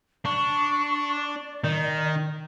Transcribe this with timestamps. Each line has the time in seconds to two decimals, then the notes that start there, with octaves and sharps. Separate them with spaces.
0.25 D4 C#6
1.16 D5
1.64 D#3